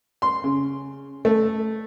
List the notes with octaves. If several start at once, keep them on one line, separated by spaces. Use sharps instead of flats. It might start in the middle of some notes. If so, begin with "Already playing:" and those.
C6
C#3
A3